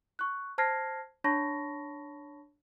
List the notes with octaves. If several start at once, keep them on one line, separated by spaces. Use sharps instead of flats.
C#6 F#6
C5 A5 F6 G#6 A#6 C7
D4 C#5 A5 B5 C#6 A#6